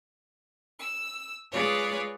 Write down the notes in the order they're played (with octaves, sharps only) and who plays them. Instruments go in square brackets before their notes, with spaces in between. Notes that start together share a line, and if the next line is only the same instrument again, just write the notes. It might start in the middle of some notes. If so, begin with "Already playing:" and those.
[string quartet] E6
G#3 F4 G#4 B4 C#5 D5